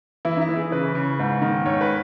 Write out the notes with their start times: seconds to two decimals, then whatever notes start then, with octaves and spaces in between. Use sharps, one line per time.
0.25 E3 E4
0.37 D#4
0.41 E4
0.49 E3
0.56 G#4
0.72 C#3 B4
0.95 C#3
1.19 G#2
1.42 D#3
1.65 G#2 C#5
1.81 B4